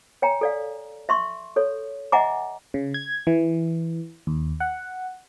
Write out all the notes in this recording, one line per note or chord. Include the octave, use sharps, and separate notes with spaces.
C#5 G5 G#5 A#5
A4 D5 F5
E5 C6 C#6
A4 C#5
D#5 E5 F#5 G#5 A#5 D6
C#3
G#6
E3
D#2
F#5